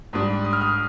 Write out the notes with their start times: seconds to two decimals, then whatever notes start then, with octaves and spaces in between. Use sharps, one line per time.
0.13 G#2 G3 D4 D#6
0.44 D#6
0.53 F6
0.61 D#6